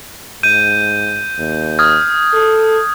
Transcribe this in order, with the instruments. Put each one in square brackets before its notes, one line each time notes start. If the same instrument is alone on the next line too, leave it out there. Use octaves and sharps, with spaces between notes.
[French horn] G#2 [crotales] G6 [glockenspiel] D#7
[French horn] D#2
[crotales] D#6 G#6 [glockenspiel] F6
[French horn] A4